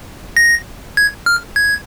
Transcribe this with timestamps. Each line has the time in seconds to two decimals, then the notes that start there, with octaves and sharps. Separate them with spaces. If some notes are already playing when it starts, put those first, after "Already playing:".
0.37 A#6
0.97 G#6
1.26 F6
1.56 G#6